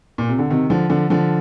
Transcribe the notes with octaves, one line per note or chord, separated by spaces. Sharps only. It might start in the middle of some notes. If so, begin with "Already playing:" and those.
A#2
C3
D3
C3 D#3
D3 F3
D3 F3
D3 F3